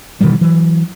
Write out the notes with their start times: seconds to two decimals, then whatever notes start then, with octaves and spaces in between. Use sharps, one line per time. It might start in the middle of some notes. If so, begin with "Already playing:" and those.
0.21 B2 D#3 E3 G3
0.41 E3 F#3